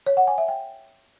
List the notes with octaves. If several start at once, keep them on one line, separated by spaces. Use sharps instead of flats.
C#5
F#5
G#5
E5
G5